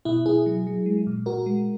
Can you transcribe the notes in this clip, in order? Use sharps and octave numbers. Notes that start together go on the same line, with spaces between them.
B2 E4
B2 E4 G#4
F#3
F#3
G#3
A#2
A#2 F#4 A#4
G#3